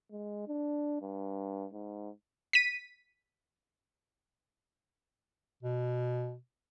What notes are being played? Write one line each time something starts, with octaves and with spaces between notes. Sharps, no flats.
G#3
D4
G2
G#2
B6 D#7
B2